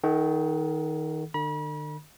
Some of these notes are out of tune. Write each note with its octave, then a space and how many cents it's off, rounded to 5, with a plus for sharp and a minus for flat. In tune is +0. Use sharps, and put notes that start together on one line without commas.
D#3 +15 A4 -30 F#5 +30
D3 +45 B5 -40